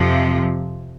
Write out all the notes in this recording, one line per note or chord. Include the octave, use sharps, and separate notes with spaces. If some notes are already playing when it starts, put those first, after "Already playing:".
Already playing: F2 C3 F3